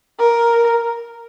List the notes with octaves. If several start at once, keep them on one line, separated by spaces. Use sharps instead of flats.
A#4